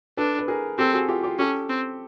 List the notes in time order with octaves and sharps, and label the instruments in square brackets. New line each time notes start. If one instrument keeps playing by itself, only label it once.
[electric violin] D4 [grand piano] A4 B4
[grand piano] B4
G#4 A#4
[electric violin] C4 [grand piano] G4 A4
[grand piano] F#4 G#4
F4 G4
F4 G4
[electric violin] C#4 [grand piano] G4 A4
[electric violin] C4